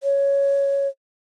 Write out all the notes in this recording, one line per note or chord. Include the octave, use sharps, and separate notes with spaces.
C#5